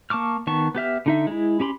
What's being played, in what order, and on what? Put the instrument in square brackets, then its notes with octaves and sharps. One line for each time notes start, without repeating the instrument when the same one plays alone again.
[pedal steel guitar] A#3 A5 C#6 D6 F6
D#3 B3 A5 C#6
B3 G4 E5 F6
D3 D#4 E5
G#3 E4
C#4 G4 B5 C6